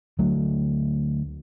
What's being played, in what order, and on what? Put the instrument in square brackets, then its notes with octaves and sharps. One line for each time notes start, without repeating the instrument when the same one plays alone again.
[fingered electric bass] D2 F#3 A3